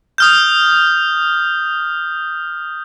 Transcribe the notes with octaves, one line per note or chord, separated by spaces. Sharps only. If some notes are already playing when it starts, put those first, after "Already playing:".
D#6 F6 G6